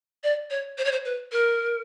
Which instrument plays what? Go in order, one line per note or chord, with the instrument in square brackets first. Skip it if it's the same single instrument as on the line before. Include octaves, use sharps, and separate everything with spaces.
[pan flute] D5
C#5
C5
C#5
C5
B4
A#4